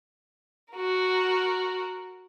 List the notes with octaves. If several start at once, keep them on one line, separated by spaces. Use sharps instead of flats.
F#4 A#4